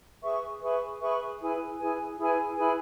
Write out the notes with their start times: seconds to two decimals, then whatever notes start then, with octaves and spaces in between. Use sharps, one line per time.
0.22 G#4 B4 E5 C#6
0.62 G#4 B4 E5 C#6
1.01 G#4 B4 E5 C#6
1.40 E4 G#4 B4 G#5
1.79 E4 G#4 B4 G#5
2.18 E4 G#4 B4 G#5
2.57 E4 G#4 B4 G#5